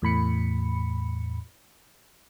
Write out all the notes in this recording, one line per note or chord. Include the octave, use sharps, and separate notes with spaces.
E2 A2 B5 C#7